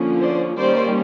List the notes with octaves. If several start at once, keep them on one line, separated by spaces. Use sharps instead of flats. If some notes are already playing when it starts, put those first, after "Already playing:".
Already playing: D3 F3 A#3 C#4
C5 D5
D#3 G3 A#3 C#4 C5 D5